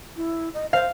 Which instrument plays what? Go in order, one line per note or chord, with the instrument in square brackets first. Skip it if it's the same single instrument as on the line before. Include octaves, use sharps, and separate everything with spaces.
[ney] E4
D#5
[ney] C5 [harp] F5